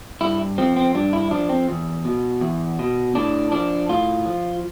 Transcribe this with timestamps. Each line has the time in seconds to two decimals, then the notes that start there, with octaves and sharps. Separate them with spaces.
0.21 G2 E4
0.58 F3 C4
0.76 C4
0.94 G2 D4
1.13 E4
1.31 F3 D4
1.49 C4
1.69 E2
2.05 B2
2.41 E2
2.79 B2
3.15 A2 D4
3.52 F3 D4
3.89 A2 F4
4.26 F3